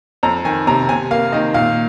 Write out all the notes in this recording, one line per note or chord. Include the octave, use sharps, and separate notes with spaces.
F2 A#5
D#3 G#5
C3 A#5
C3 G#5
A#3 F5
D#3 D#5
A#2 F5